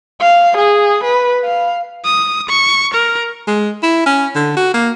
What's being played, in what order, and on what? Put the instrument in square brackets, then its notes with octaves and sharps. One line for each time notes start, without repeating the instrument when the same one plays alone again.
[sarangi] F5
G#4
B4
F5
[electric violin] D#6
C#6
A#4
[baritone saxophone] G#3
E4
C#4
D3
F#4
A#3